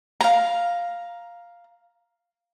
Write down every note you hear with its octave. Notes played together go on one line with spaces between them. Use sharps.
F5 A#5